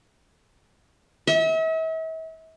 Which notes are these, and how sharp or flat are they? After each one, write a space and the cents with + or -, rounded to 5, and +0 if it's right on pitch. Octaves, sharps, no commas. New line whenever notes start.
E5 -40